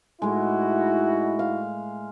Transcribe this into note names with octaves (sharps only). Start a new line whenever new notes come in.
A2 G#3 D#4 E4 F#4
F5